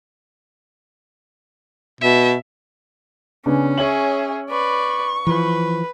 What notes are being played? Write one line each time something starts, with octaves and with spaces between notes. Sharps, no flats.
B2 E5
C#3 B3 C#4 D4
G#4 C#5 E5 F#7
B4 D5 C#6
E3 F3 B4